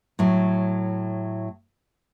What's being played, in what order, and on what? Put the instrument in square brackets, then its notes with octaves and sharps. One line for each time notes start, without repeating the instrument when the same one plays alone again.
[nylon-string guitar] A2 F#3